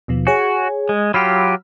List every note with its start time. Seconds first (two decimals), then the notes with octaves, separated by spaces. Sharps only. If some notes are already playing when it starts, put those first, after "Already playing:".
0.08 D#2 B2 F3
0.27 F#4 G#4 C#5 G#5
0.89 G#3
1.14 F#3 F4 G4 B5 E6 F6